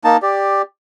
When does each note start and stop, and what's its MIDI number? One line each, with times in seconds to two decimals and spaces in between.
0.04 0.17 58
0.04 0.17 63
0.04 0.17 81
0.22 0.62 67
0.22 0.62 74